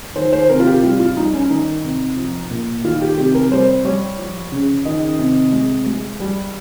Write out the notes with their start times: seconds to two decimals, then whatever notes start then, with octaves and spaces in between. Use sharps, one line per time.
0.16 D#3 C5
0.32 C5
0.49 C3 A#4
0.60 F4
0.66 G4
0.83 G3 F4
1.00 F4
1.17 G3 D#4
1.33 C#4
1.50 D#3 D#4
1.84 C3
2.17 F3
2.50 A#2
2.84 D#3 F4
3.01 G4
3.18 C3 G4
3.35 A#4
3.51 G3 C5
3.84 G3 C#5
4.19 F3
4.52 C#3
4.85 D#3 D#5
5.19 C3
5.52 G#3
5.86 G#3
6.20 G3